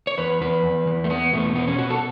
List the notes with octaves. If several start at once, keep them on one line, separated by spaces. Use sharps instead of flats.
C#5
E2 B4
E2 B4
E2
E2
A3
E2 B3
B2 A3
B2 B3
C#4
B2 F#4
A4